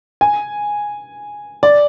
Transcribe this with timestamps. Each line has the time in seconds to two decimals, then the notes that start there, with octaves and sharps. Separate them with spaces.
0.21 G#5
1.63 D5